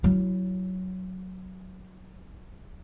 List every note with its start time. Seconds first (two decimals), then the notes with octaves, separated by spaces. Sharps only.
0.03 F#3 E4